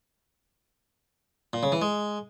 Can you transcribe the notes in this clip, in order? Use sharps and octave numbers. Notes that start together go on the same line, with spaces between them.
A#2
C#3
E3
G#3